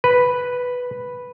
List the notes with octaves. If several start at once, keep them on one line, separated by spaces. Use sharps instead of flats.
B4